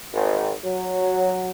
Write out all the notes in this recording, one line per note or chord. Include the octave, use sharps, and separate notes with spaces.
G#1
F#3